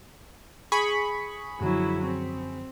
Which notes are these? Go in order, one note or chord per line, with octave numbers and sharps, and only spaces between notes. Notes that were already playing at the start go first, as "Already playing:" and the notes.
G#4 B5 C#6
F#2 D3 F3 F#3 E4
C4